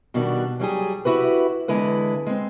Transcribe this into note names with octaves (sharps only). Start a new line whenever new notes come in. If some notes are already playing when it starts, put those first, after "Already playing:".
B2 D#3 G3 D4 F#4
F#3 G3 G4 G#4
E4 F#4 G4 B4
E2 D3 G#3 E4 B4
G#3 C4